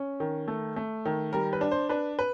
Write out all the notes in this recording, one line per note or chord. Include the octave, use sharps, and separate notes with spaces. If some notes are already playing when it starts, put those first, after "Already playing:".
Already playing: C#4
D#3
A3
A3
D#3
G3 A#4
B4
D4
C5
D4 B4
B4